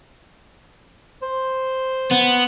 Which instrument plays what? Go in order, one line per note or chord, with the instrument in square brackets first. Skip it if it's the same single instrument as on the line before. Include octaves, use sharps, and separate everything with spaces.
[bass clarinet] C5
[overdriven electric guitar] B3